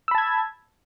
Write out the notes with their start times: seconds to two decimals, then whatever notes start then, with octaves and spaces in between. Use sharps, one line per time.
0.08 E6
0.11 B5
0.15 A5
0.18 G#6